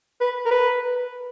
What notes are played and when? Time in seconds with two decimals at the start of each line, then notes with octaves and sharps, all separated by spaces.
0.21 B4
0.46 A#4
0.51 B4